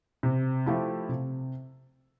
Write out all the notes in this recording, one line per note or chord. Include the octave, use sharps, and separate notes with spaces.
C3
F3 A3 E4 G4
C3